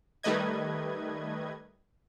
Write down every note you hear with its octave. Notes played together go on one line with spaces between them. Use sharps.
D#3 G3 A3 B4 D#5 G#6